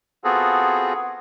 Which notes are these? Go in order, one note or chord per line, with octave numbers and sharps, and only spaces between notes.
B3 C4 F4 F#4 G#4 A4